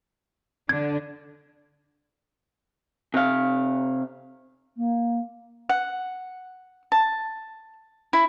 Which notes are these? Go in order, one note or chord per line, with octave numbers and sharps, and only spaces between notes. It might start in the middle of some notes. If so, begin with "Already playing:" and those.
D3 D4 G#6
C3 F5
A#3
F#5
A5
E4